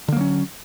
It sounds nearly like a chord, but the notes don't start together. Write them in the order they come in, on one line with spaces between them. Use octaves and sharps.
D3 A#3 F#3 C#4